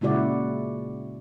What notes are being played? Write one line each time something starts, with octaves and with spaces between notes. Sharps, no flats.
A#2 C#3 G#3 E4 F#4 D5